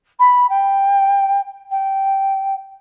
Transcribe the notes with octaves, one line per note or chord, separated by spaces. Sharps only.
B5
G5
G5